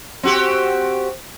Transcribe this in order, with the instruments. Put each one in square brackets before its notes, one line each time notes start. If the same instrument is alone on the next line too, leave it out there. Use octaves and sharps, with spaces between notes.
[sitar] C4 F#4 G4